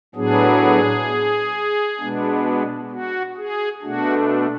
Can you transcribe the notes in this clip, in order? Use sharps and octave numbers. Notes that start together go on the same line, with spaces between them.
A2 F#3 B3 D4 G#4
B2 G#3 B3 D4
F#4
G#4
B2 A3 D4 F#4